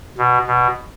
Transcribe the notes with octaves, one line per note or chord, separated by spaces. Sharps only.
B2
B2